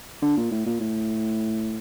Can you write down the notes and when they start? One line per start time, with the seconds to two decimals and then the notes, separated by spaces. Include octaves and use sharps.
0.22 D3
0.37 A#2
0.51 A2
0.66 A#2
0.80 A2